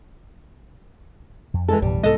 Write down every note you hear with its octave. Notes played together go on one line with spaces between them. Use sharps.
F2
E3 G#3 A4
A1 F2 B2 G3
C2 G#2 G#3 B3 A4 D#5